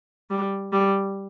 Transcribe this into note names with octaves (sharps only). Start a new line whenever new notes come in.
G3
G3